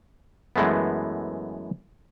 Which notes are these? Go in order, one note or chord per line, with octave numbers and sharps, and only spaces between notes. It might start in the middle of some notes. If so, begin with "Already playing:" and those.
F#2 E3 G#3 A3 B3